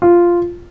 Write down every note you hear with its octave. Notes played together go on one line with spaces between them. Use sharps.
F4